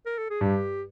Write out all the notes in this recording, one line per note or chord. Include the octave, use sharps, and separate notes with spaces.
A#4
A4
G#4
G2 G4